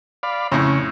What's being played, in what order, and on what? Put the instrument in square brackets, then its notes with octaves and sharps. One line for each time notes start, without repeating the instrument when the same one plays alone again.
[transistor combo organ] D5 F5 B5
[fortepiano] F2 A2 [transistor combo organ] C#3 C#4